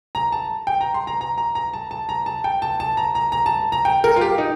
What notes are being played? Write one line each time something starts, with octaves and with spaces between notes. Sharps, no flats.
A#5
A5
G5
A#5
C6
A#5
A#5
A#5
A#5
A5
A5
A#5
A5
G5
A5
A5
A#5
A#5
A#5
A5
A#5
G5
A#4
F4
G4
D#4